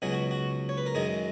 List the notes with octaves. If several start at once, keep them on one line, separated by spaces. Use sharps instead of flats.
C#2 B2 F#3 G#4
F#4
F#4
C#5
B4
A#4
F#2 D#3 G#3 G#4